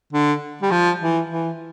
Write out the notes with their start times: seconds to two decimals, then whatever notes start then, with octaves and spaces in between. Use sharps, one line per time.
0.13 D3
0.62 G3
0.71 F3
1.00 E3
1.30 E3